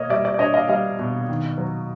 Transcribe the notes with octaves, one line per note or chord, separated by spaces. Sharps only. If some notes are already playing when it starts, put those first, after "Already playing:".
Already playing: B2 A#3 C#5 D#5
G3 D5 E5
D5 E5
D5
D4 C#5 D#5
D#5 F5
G3 D#5 F5
B2
D#3
F#3